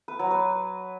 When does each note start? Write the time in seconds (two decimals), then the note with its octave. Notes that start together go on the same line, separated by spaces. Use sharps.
0.08 B4
0.19 F#3
0.31 B4